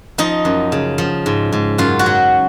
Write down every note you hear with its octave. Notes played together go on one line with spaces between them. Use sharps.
F3 D#4
F#2
C#3
F3
G#2
G#2
F#2 F4
F#4
F#3